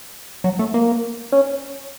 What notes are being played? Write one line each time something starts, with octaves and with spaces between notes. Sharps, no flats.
F#3
A3
A#3
C#4